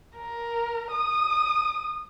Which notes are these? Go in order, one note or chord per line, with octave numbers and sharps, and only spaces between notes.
A#4
D#6